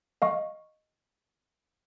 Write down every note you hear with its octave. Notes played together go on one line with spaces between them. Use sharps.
D#5 F5 C#6